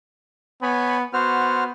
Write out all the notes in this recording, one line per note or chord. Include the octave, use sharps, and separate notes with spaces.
B3 C#5 G#5 B5
B3 F#4 C5 F6